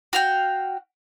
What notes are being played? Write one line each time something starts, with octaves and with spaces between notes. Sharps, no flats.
F#4 F5 G5